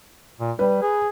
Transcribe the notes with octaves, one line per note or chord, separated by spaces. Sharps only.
A#2
G3 B4
G#4